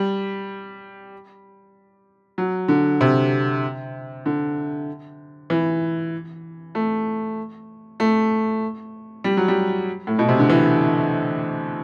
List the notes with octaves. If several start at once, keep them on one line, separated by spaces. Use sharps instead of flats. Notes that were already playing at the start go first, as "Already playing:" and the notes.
Already playing: G3
F#3
D3
C3
D3
E3
A3
A3
G3
F#3
G3
A2
B2
C3
D3
E3